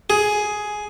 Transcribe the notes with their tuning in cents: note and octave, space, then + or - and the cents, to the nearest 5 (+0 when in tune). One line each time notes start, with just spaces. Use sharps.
G#4 +10